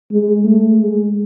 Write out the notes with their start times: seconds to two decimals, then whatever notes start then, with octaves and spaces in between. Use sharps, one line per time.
0.12 G#3
0.45 A3
0.78 G#3